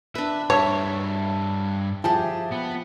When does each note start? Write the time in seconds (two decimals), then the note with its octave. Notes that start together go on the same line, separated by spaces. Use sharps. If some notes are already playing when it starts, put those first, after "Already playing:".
0.15 D4 B4 E5
0.50 G2 C#5 E5 A5
2.04 F3 G4 G#4 E5 A5
2.51 B3